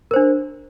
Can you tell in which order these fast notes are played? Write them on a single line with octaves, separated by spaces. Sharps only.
A#4 C5 D4